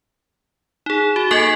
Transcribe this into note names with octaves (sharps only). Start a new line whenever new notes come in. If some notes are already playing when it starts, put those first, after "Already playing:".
D#4 G#4
F#4
A#3 A4 D#5 G#5 G#6